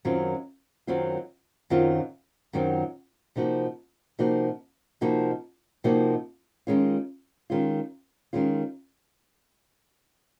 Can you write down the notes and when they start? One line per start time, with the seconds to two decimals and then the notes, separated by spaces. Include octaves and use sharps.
0.05 F#2 D#3 F#3 C4 F4
0.87 F#2 D#3 F#3 C4 F4
1.70 F#2 D#3 F#3 C4 F4
2.53 F#2 D#3 F#3 C4 F4
3.36 C3 F3 A#3 D#4 F#4
4.19 C3 F3 A#3 D#4 F#4
5.01 C3 F3 A#3 D#4 F#4
5.84 C3 F3 A#3 D#4 F#4
6.67 D#3 G#3 C#4 F4
7.50 D#3 G#3 C#4 F4
8.33 D#3 G#3 C#4 F4